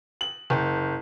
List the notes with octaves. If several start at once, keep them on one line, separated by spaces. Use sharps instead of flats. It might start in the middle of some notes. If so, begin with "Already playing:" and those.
F#7
F#1